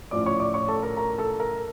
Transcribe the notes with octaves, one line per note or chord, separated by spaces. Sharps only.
A2 F3 C#4 F4 D5 D6
C#5 C#6
D5 D6
C#5 C#6
A4 A5
A#4 A#5
A#4 A#5
A4 A5
A#4 A#5